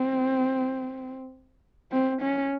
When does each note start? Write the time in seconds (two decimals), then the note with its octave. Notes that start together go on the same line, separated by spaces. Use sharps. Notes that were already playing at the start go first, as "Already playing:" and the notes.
Already playing: C4
1.92 C4
2.22 C#4